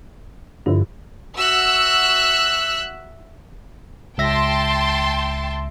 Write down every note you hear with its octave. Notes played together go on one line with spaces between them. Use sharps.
G2 D3 F3 E4
F#4 E5 E6 F#6
C#2 E5 G5 A5 C6 A#6